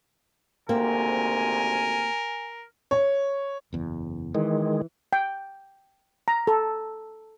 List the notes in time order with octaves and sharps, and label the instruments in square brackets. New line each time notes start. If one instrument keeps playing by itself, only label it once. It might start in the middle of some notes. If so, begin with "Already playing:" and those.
[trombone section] G#1 D2 C3 [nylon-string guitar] A#3 C4 [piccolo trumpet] A#4 [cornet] G#5
[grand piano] C#5
[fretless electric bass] F#1 E2
[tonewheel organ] D#3 G#3 [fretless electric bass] E3
[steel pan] G5
A#5
A4